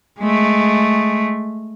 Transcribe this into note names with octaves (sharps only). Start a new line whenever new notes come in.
G#3 A3